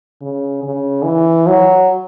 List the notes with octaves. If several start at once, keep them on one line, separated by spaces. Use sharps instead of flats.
C#3
C#3
E3
F#3